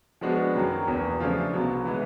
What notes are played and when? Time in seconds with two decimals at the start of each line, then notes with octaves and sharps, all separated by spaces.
0.21 F3 G#3 B3 D4 F#4
0.54 F#2 D#3 F#3 A#3
0.87 E2 B2 F#3
1.20 C#3 F3 A3 D4 F4
1.53 C2 B2 F#3
1.86 E3 G#3 B3